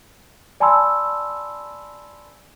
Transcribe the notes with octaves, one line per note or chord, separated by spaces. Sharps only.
D5 G#5 A5 B5 C6 E6